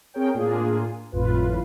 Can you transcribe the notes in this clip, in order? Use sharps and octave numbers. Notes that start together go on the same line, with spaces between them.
C4 G#4 A#4 C#5 G5
A2 A#3 D4 F4 G#4
G#1 F2 A2 F4 B4